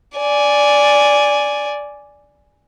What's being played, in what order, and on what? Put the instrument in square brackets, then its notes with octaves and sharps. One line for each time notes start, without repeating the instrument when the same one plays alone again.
[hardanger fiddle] D5 G#5